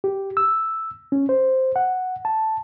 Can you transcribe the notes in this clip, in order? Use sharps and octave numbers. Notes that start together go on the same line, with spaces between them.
G4
E6
C#4
C5
F#5
A5